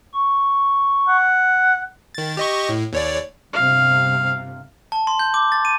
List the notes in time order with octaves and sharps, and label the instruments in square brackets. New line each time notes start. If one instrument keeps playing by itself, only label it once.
[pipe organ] C#6
[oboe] F#5
[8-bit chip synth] D#3 A6
G4 D#5 C#6
A2
D#2 C#5 D5
[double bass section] G1 C3 [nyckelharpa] F5
[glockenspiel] A5
C6
G6
D6
A6
D#7